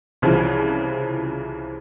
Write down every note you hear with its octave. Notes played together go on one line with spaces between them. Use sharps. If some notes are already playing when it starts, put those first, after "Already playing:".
C2 C#3 E3 F3